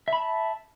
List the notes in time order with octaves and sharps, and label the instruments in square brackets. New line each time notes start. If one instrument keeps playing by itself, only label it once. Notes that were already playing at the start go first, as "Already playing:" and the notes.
[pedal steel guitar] E5
B5
A5